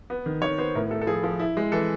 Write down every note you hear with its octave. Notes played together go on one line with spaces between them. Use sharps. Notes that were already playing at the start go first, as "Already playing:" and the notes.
B3
D#3
D#3 C#5
B3 C5
A2 A#4
A3 A4
A4
F3 G#4
F3
E4
G#3
E3 A4